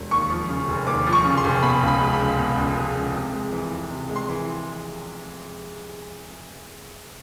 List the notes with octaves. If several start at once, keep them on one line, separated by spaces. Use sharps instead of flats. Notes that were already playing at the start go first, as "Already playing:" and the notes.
Already playing: E1
D#2 C#6
F3
C#3
F1
D#2 D6
F3
C#6
C#3
C6
F1
B2 B5
C#2
B5
G#3
B5
C#2
B2
C#2
G#3
C#2
C3
G#3
E3
F2
C3
G#3
C6
E3